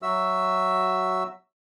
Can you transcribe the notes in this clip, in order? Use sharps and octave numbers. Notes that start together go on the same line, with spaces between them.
F#3 F#4 E5 E6